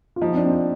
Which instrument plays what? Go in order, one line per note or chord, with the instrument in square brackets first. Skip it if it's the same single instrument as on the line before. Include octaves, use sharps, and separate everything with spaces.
[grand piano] F4
[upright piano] F3 [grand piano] D#4
[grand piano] C4
D4
[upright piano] C4
[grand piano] F4